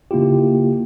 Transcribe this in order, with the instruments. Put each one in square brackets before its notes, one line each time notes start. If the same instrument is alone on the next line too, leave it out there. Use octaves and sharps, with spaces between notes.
[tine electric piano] C#3 A#3 E4 F4 G4